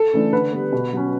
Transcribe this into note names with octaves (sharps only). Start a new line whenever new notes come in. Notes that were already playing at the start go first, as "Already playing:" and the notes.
Already playing: A4
C#3 E3 A3 D4
D3 B4
G3 B3
B2
F#3 C#4